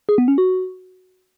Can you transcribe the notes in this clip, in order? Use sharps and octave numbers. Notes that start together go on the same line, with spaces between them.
G#4
B3
C#4
F#4